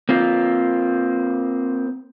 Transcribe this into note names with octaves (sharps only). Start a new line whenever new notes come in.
A#3 C4 F4